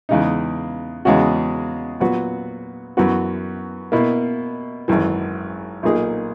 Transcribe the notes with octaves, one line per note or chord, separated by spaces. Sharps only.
E2 C#3 G#3 D#4
E2 C#3 G#3 C#4 F#4
A#2 F#3 B3 F#4
F#2 E3 B3 F#4
B2 A#3 E4
G#1 F#2 E3
B1 A#2 A#3 D#4 G#4